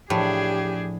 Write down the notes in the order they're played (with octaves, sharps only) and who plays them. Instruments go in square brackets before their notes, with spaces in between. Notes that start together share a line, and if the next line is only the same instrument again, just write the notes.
[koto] A2 [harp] F3 [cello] D4 G#4 [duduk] G4